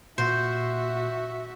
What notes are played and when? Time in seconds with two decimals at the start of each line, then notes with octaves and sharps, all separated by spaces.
0.18 A#2 F#4 C5 E5